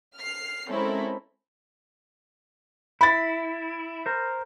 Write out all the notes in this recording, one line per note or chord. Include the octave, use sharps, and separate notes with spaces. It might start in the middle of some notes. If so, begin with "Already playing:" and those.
F6 C7
G#3 C4 C#4 E4 A4 A#4
E4 B5 A6
A#4 C5